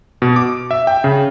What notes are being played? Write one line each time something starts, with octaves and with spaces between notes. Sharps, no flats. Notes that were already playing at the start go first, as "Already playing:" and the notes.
B2
D6
E5
G5
C#3